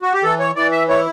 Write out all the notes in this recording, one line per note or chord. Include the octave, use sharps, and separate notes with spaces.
F#4
G4
E3 A4
C#5
E3 D5
E5
E4 C#5